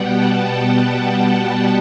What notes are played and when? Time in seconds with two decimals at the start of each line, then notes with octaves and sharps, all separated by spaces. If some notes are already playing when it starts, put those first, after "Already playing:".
Already playing: B2 G3 B3 F#5 G5
0.13 A5
0.41 G5
0.84 A5